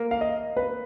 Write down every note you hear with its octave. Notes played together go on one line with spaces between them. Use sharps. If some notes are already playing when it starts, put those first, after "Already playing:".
Already playing: A#3
F5
D#5
B4